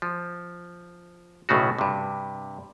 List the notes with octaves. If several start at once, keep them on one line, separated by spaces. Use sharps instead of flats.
F3
B1 A2 C#3 A3 F#4
G2 C3